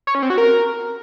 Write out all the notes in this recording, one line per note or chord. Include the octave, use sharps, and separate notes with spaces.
C#5
C#4
C4
F#4
A#4